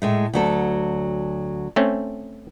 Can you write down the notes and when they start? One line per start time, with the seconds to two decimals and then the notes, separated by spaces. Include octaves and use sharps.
0.02 A2 G#3 A3
0.33 D2 F#3 A4
1.76 A3 C4 C#4